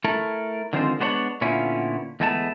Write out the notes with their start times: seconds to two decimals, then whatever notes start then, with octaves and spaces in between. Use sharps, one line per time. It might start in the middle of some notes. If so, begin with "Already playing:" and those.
0.04 A3 E4 A4 A#4
0.73 D3 D#3 F3 G#3 C4 C5
1.00 G#3 B3 D4 C5 C#5 F#5
1.41 A#2 D3 B3 C#4 E4 F4
2.20 E2 G#3 A3 B3 G#5 A5